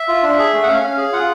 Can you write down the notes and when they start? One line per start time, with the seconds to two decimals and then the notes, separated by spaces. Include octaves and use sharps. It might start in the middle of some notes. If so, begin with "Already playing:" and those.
Already playing: E5
0.08 F4
0.23 D4
0.39 G#4
0.53 A3
0.63 F#5
0.68 C#4 F5
0.83 C#4
0.98 G#4
1.12 F4 F#5